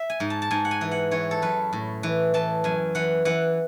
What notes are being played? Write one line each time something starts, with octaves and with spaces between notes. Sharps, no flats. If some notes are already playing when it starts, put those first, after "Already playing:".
Already playing: E5
G#5
G#2
A5
A5
G#2 G#5
F#5
G#5
E3
F#5
E3 C#5
A4
F#2 B4
A2
E3
E3 A5
F#2 G#5
E3 F#5
E3 F#5